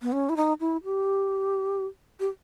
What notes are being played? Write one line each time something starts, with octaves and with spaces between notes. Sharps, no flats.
B3
C#4
E4
D#4
E4
G4
G4